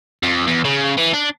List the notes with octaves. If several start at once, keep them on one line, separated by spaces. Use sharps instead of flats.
F2
E2
C#3
E3
D4